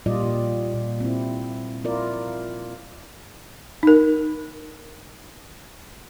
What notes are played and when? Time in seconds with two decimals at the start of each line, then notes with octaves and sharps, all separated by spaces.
0.06 A#2 G3 F4 D5 D#5
0.73 A#2
1.00 C4 E4
1.84 E4 F4 A#4 D5
3.83 D#4 A#4